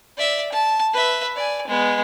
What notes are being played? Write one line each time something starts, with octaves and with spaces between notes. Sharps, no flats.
D5 E5
A5
B4 E5
D5 G#5
G#3 B3